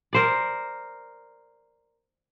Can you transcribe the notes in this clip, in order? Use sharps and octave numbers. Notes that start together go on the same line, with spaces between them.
A#4 C5 D5